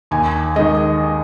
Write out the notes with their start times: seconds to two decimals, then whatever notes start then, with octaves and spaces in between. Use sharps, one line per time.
0.11 D#2 G#5
0.56 D#3 G#3 D#5